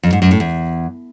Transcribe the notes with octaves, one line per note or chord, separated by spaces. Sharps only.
F2
G#2
F#2
A2
E2